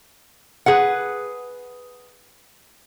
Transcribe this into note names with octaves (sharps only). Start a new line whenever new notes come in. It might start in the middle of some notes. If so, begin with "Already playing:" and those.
G#4 B4 F#5